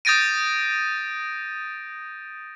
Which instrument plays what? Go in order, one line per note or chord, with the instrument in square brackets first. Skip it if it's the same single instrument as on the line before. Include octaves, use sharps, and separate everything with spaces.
[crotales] D#6 G6 A6 A#6 D7 D#7